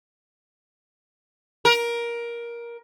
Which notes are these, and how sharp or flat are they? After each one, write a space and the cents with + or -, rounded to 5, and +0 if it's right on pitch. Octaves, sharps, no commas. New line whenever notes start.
A#4 +15